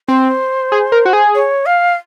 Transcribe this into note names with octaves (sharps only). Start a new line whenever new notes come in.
C4 C5
G#4
A#4
F#4
G#4
C#5
F5